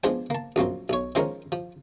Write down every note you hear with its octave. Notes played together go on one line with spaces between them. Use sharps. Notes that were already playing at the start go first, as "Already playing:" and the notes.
F3 G#3 B3 C4 D4 C5
A#3 A5
A#1 F#2 A#3 C4
B1 C#5
D#3 F3 G#3 C4 C#4 A#4
F3